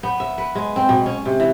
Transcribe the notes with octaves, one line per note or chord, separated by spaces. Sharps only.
B3
E5
B4
G#3
C4
B2
C#4
C3
E3